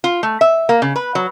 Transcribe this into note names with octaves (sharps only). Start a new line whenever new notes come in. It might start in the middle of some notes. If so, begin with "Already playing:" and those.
F4
A3
E5
A#3
C#3
B4
F#3